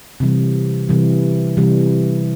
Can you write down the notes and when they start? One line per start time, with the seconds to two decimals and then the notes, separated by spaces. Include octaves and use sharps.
0.20 C3 E3 G3
0.89 C3 E3 G3
1.57 C3 E3 G3